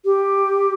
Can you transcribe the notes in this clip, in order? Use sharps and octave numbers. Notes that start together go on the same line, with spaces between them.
G4